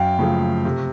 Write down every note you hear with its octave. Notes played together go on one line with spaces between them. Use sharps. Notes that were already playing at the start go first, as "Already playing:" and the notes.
Already playing: F#2 F5 G5
C#3 F3 A3
C3